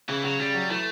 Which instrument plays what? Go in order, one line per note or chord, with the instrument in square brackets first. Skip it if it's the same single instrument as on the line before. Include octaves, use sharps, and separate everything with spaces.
[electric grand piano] C#3 [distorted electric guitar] E3
[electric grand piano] C#3 [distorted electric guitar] F#3
[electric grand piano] C#3 [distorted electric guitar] G3
[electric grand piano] F#3
[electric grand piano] E3 [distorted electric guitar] A3